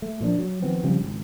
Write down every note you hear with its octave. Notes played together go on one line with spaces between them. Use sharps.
A3
A#2 F3 D4
F#3
D#3 F3 B3 C4
C#3 F3 G3 C4
G#1 C#2